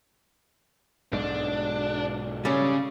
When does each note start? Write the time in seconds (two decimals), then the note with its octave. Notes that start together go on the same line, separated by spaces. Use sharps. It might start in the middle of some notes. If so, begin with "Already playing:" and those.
1.13 B1 G#2 B2 D4
2.45 C#3 G3 A3 C#4